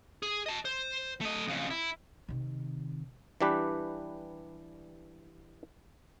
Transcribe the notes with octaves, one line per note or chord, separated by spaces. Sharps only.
G#4
D#5 A5
C5
A3 D#5
F2 C#3
E4
C3 D#3
E3 G3 D4 G4 B4